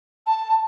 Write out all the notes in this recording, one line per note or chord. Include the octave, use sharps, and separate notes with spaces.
A5